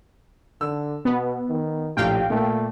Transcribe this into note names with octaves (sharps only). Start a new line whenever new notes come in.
D3 E6
B2 B3
D#3
A#1 A2 G4 F5 G5
A#2 A3